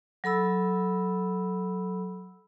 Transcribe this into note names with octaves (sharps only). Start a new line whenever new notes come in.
F#3 A4 B5 E6